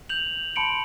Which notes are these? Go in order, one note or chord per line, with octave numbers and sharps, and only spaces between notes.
G6 F7 F#7
A5 B5 C6 C#7 D7 F#7